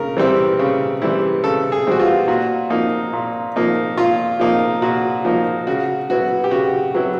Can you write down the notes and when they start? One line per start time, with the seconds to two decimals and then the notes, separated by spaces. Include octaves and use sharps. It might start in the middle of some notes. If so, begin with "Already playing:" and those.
Already playing: C#3 A#4
0.17 E3 G3 C4 E4
0.59 C#3
1.02 E3 G3 C4 E4
1.44 C#3 A4
1.72 G#4
1.87 E3 G3 C4 E4 F#4
2.00 F4
2.28 A#2 F#4
2.70 F3 A#3 D#4
3.13 A#2
3.56 F3 A#3 D#4
3.98 A#2 F4
4.40 F3 A#3 D#4
4.82 A#2 F#4
5.25 F3 A#3 D#4
5.67 C#3 F#4
6.10 F#3 B3 E4 F#4
6.44 G4
6.51 C#3 F#4
6.94 F#3 B3 E4